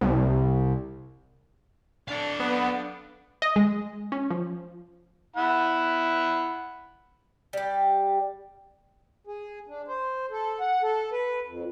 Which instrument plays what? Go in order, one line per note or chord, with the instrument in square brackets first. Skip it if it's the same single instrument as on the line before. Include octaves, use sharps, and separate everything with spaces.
[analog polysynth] C2
[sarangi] D4 [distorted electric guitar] A4 F5
[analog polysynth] B3
[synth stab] D#5
G#3
C#4
F3
[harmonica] E4 F#5 B5
[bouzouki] G3 G4
[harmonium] G#4
D4
C5
A4
F#5
A4
B4
F2